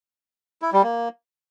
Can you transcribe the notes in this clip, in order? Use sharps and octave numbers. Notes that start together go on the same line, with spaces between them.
E4
G3
A#3